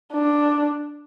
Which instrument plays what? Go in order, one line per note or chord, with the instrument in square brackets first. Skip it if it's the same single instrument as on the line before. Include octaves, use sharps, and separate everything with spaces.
[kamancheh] D4